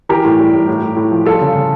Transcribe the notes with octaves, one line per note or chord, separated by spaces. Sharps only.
E3 G4 A#4
A2
G3
A2
A2
A2
A2
F3
G3 F4 A4
C#3
C#3